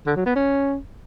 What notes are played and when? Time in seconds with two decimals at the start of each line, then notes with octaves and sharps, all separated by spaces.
0.07 D3
0.16 F#3
0.26 B3
0.36 C#4